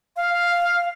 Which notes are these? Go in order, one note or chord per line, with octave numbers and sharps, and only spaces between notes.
F5